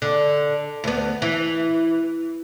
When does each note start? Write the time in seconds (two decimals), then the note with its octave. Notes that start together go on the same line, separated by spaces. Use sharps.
0.02 D3
0.84 D2 B3
1.22 E3